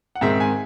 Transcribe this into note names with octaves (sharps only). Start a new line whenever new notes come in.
F#5
G#2 D#3 G#3 C4 E5
G#5